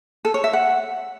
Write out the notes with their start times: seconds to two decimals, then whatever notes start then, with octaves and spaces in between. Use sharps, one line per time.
0.25 A4
0.34 C#5
0.44 E5
0.53 F#5